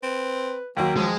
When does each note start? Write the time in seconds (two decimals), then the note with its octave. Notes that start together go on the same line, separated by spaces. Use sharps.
0.03 C4 B4
0.77 D#2 F#3 A#3 G5
0.97 C#2 F3 G#3